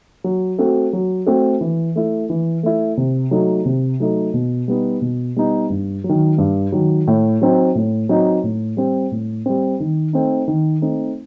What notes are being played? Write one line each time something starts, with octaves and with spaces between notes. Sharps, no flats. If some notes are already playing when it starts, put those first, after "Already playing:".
F#3
A3 C4 F#4 A4
F#3
A3 C4 F#4 A4
E3
A3 E4
E3
A3 E4
C3
F#3 A3 D#4
C3
F#3 A3 D#4
B2
G3 B3 D#4
B2
G3 B3 D#4
G2
F#3
D#3
G2
D#3 F#3
A2
F#3 C4 D#4
A2
F#3 C4 D#4
A2
G3 C4
A2
G3 C4
D#3
A3 C4 D#4
D#3
A3 C4 D#4